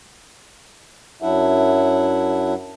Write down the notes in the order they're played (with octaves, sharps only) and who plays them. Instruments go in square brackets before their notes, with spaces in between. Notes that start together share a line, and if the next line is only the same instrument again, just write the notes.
[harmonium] F#2 F#3 D4 E4 E5 F#5